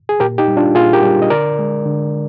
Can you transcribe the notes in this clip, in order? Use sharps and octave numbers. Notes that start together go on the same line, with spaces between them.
G#4
A#2 G4 A#4
D#4 G4
G3
D4 F4
A#2 F4 G#4
G4 A#4
G3
D#5
D3 A#4 D5
G#3
D3